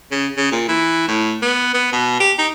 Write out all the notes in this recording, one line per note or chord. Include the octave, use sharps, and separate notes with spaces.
C#3
C#3
A#2
E3
A2
B3
B3
B2
G4
D#4